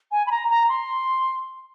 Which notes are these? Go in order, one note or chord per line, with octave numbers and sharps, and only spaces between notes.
G#5
B5
A#5
A#5
C6